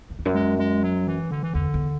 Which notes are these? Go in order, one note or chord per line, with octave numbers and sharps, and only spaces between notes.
F#2
E2
F#2
G#3
G#3
F#3
E3
D3
E3
E2 D3
E2